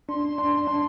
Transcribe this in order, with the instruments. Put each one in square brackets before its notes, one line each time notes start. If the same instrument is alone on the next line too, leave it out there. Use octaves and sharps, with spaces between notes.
[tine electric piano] D4 [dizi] C6
[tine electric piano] D4
D4